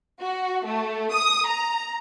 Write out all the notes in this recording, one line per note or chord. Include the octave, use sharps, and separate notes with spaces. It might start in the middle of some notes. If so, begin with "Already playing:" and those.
F#4
A3
D#6
A#5